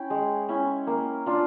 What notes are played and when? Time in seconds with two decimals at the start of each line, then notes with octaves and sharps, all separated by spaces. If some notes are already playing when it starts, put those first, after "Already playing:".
Already playing: C#4 E4 G5
0.10 G#3
0.49 C#4 E4
0.87 A#3
1.26 D4 F4